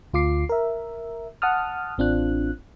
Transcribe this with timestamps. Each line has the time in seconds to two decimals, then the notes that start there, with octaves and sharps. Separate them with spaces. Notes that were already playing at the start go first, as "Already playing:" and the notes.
0.13 D2 F4 D6 C7
0.49 A#4 E5
1.42 F#5 A5 D#6 F6
1.98 A1 C4 D4 F4 F#6